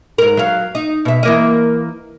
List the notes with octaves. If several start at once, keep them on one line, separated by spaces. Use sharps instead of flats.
G#2 A#4
F#3 F5
D#4
B2 E5
E3 A#3 D#5